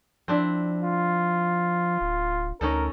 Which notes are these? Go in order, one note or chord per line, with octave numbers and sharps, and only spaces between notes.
F3 C4 D4 E4
F4
D1
D2 C#4 D#4 A4 A#4